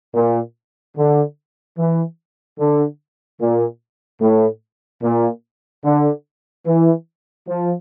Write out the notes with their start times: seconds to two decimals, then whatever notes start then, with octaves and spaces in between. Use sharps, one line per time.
0.14 A#2
0.96 D3
1.78 E3
2.59 D3
3.40 A#2
4.21 A2
5.02 A#2
5.85 D3
6.66 E3
7.47 F3